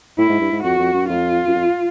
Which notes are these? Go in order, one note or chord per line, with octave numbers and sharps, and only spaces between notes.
A2 E4
G#2
G2
G#2
F2 F#4
F2
F#2
F2 F4
F#2
F2